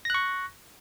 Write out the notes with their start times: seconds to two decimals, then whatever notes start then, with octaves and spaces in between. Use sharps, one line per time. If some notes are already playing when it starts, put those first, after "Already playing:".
0.05 A#6
0.10 F#6
0.14 C#6